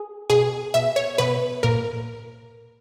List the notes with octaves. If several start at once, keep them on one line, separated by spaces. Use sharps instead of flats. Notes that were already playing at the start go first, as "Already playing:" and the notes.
Already playing: G#4
B2 G#4
B2 E5
C#5
B2 B4
A#2 A#4